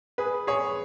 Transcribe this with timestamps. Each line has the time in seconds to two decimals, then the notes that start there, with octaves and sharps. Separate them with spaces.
0.18 G#4 B4
0.47 G#4 C#5